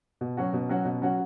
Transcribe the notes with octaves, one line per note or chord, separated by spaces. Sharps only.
B2
F#3 C#4 F#4
B2
F#3 C#4 F#4
B2
F#3 C#4 F#4